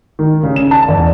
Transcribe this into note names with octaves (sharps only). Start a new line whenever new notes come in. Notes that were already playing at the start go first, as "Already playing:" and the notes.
D#3
C#3
E7
A5
E2